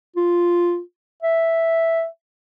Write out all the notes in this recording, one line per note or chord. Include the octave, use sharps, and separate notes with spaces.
F4
E5